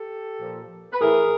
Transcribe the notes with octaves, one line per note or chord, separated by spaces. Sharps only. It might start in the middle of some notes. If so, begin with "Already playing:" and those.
Already playing: G4 A4
A#2 F3
B4
A2 E3 G#4 A#4